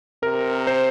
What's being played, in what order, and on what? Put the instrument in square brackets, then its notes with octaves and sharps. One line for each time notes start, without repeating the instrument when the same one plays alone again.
[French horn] C3 [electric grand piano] A#4
[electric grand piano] C5